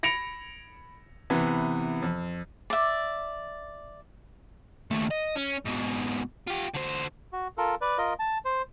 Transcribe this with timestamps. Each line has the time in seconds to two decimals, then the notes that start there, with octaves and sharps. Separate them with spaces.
0.03 B5 A#6 C#7 D7 F7
1.30 C3 E3 B3
2.02 F2
2.70 D5 E5
4.91 D#2 A3
5.11 D#5
5.36 C#4
5.66 G#2 B2
6.48 F4 G4
6.75 D3 C5
7.33 F#4
7.58 F4 A4 A#4
7.81 B4 D5
7.98 F4 A#4 D#5
8.19 A5
8.45 C5